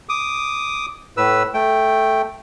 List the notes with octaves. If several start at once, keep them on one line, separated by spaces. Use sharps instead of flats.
D6 D#6
A2 B4 E6
A3 G5